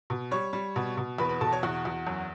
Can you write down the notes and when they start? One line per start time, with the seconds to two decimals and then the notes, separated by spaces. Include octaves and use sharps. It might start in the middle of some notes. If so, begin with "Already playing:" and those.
0.10 B2
0.31 G3 C#5 C#6
0.53 G3
0.76 B2
0.97 B2
1.18 E2 B4 B5
1.29 B4 B5
1.41 B2 A4 A5
1.52 C#5 C#6
1.63 E2 F#4 F#5
1.85 E2
2.07 F#2